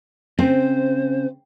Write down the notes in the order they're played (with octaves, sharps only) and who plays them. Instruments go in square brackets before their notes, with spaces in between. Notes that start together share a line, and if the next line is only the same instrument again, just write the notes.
[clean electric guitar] C#3 [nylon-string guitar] C4 [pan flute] C5